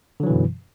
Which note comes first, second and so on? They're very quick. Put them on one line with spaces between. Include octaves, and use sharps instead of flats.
D3 F#3 E3 B2 F#2